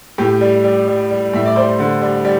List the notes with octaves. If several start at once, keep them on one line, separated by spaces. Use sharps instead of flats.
A2 G4
G3
G3
G3
G3
A2 E5
D5
G3 C5
D3
G3
G3